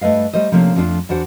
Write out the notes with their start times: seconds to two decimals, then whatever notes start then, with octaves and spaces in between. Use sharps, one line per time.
0.01 G2 A3 B4 D#5 F5
0.33 G3 A3 C5 D#5
0.52 C3 F3 A3 A#3 C#4 D4
0.75 F2 F3 A3 C4 D4 F4
1.09 E2 D4 F#4 C5 F#5